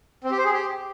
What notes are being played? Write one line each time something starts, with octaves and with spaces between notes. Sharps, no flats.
C4
G4
C5
G#4
G4